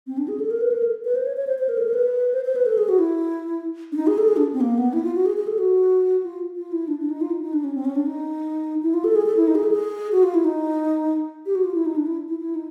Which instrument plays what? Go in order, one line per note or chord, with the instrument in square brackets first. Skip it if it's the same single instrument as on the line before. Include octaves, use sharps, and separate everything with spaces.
[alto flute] C4
D4
G#4
A4
A#4
B4
A#4
A4
B4
C5
C#5
C#5
C5
C5
A#4
A4
A#4
B4
C5
C5
B4
A4
G#4
F#4
E4
D4
D#4
G#4
A4
G#4
D4
C4
A#3
B3
E4
F4
F#4
G#4
G#4
A4
F#4
F4
F4
E4
D4
D4
D#4
F4
D#4
D#4
D4
C#4
C4
C#4
D4
D#4
E4
F4
A4
G#4
A4
E4
D#4
G#4
A4
G#4
F#4
F4
E4
D#4
G4
F#4
F4
E4
D#4
D4
E4
E4
E4
D#4